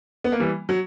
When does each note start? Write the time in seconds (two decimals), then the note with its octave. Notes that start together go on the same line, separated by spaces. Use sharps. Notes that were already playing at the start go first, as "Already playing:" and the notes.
0.24 B3
0.32 A#3
0.40 E3 G3
0.69 F#3